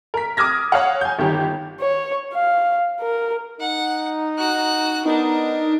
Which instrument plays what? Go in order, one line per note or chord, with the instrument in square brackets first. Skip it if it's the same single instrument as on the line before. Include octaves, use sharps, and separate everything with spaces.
[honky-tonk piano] A#4 B6
D6 D#6 F6 G#6 A#6
C#5 F5 F#5
G#5 G6
G1 D#3 G4
[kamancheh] C#5
F5
A#4
[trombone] D#4 [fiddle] F#5
[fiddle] F#4 F#6
[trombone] B3 [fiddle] D4 A#4 [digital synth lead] D#4